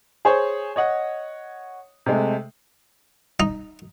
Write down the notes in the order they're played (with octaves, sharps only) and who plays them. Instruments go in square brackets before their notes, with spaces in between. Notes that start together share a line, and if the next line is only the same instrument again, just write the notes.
[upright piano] G#4 C5 C#5
C#5 D#5 F#5
C3 G#3 A3
[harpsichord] D#4